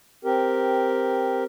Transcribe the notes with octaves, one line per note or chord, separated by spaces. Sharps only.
C4 G4 A#4